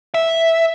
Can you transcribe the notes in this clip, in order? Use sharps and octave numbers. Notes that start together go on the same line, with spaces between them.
E5